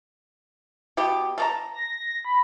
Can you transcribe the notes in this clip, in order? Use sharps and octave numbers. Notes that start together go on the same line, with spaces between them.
B2 B3 G4
A3 A5 A#5
A#6
B5